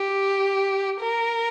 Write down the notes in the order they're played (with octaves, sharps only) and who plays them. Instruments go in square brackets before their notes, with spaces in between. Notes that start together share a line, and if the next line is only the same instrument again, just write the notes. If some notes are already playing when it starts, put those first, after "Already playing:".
Already playing: [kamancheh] G4
A#4